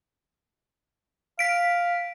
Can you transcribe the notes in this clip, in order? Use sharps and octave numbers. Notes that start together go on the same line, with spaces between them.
F5 B6 D7